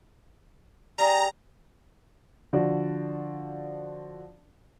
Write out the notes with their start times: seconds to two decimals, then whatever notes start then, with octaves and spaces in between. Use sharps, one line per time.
0.98 G3 D4 G#4 A#5
2.53 D3 F3 F#4 D5